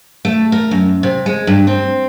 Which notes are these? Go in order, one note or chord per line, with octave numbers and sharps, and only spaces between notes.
A3
A#4
F#2
C3
G#3
G2
C4